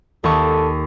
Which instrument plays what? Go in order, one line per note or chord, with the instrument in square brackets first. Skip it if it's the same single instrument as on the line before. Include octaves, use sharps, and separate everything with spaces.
[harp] D#2 C#6 [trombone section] A4